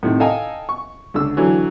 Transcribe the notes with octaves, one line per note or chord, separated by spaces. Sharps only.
A2 C3 D#3
A4 D#5 F5 G5 G#5 A#5
C#6
C#2 D3 E6
D3 E3 F#3